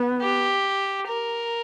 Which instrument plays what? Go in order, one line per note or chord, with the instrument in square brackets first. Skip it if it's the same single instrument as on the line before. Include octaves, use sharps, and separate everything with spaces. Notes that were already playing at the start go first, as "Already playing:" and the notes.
Already playing: [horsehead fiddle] B3
[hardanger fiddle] G4
A#4